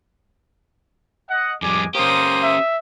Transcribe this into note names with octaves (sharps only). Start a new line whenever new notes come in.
D#5 F#5
F2 G3 G#3 G#5 D6
A#3 C#4 G4 C5 D#6
E5